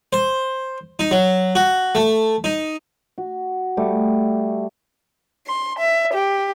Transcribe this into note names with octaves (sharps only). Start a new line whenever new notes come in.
C5
D#4
F#3
F#4
A3
D#4
F#4
G3 A3 C#6 D6
C6
E5
G4